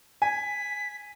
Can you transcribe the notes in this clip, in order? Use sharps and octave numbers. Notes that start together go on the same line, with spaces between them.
G#5 B6